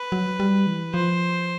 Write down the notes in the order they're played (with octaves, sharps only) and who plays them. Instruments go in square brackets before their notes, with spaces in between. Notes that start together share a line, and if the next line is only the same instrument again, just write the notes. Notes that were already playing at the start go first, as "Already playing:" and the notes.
Already playing: [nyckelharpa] B4
[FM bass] F#3
G3
E3
[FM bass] F3 [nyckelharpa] C5